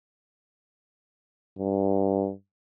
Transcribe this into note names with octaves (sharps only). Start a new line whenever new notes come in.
G2